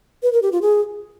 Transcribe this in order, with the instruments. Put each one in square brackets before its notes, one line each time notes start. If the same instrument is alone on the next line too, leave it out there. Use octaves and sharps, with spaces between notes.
[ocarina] B4
A#4
G4
F4
G#4